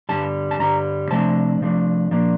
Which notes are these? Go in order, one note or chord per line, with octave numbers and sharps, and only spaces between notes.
G2 D3 G3 A5
A5
G2 D3 G3 A#5
C3 F3 A3 D4 A5
C3 F3 A3 D4
A#2 F3 A#3 D4